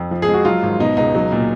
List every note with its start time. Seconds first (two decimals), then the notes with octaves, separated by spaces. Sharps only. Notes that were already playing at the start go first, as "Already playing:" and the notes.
Already playing: F2
0.11 F3
0.22 G#4
0.28 G#3
0.34 F#4
0.45 F#3 F4
0.63 G#1
0.80 B2 D#4
0.97 C#2 D#4
1.15 F#3
1.32 A#2